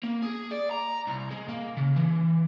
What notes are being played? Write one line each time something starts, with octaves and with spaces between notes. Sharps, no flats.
A#3
G#4
D5
A#5
C2
G#3
A#3
C#3
E3